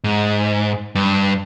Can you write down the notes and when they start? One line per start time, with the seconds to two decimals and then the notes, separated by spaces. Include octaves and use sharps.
0.04 G#2
0.95 G2